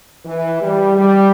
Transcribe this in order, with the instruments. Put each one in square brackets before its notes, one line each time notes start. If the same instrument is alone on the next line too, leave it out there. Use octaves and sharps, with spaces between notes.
[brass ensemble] E3
G3
G3